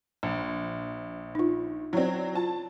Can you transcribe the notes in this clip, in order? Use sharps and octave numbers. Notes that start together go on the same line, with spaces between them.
A#1
D#4 F4
F#3 C4 E4 D5
F4 A5